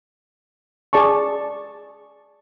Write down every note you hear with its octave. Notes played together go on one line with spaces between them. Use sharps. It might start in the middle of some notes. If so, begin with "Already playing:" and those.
G#4 D5 A5 C#6